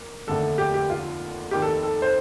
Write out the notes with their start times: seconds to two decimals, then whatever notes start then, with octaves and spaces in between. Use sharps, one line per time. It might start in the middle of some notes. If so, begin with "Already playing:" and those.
Already playing: A#3
0.27 F1 D#2 D3 A3 A4
0.58 G4
0.74 G4
0.90 F4
1.51 F1 D#2 D#3 G4
1.62 A4
1.83 A4
2.02 C5